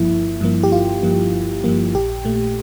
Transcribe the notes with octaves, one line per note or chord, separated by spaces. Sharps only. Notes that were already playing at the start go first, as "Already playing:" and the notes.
Already playing: G1 G2 F3 A#3 E4
G1
G2 F3 A#3
G4
G1 F4
G2 F3 A#3
G1
G2 F3 A#3
A#1 G4
A#2 A3